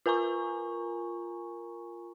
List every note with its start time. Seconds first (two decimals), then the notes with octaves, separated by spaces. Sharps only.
0.06 F4 A#4 G#5 A#5 C#6